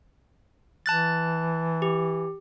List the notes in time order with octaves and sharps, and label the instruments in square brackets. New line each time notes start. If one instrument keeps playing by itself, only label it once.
[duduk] E3 [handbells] A5 F#6 A6
[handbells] G4